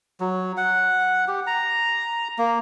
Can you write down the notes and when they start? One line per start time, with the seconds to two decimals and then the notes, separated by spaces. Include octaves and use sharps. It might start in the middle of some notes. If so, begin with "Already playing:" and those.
0.20 F#3
0.57 F#5
1.28 G4
1.47 A#5
2.38 A#3